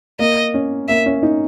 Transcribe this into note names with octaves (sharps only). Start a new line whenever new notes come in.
A#3 D#5
C#4
A#3 E5
C#4
D#4